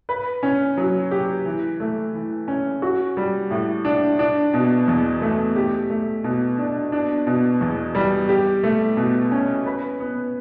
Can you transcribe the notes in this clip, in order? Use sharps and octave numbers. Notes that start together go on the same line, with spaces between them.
B4
C#4
F#3
G4
E3
A3
E3
C#4
F#4
G3
A2
D4
D4
B2
E2
A3
G4
A3
B2
D4
D4
B2
E2
G3
G4
A3
B2
C#4
B4
B3